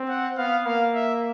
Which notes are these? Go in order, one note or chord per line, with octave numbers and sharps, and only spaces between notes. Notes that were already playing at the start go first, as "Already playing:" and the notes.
Already playing: C4
F#5
B3 F5
A#3 F5
E5